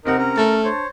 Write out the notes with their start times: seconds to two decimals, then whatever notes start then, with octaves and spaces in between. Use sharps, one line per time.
0.05 C3 C4 D#4 A#4 F#5
0.18 C#4 A#4
0.37 A3 A6
0.64 D4 C5 C#5